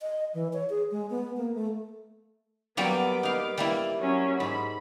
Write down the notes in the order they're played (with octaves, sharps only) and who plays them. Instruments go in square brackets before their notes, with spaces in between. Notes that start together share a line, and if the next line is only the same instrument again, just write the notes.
[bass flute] D#5
E3
C#5
G#4
G#3
B3
A#3
A3
[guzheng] F#3 G3 A#3 [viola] B3 D6
[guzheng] D#4 F5
G3 A#3 E4
[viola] F#3 C#4
[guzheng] G#2 [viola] B5